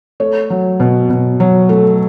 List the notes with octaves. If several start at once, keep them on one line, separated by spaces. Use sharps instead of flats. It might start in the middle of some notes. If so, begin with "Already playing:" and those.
A3 C#5
F#3
B2
B2
F#3
A3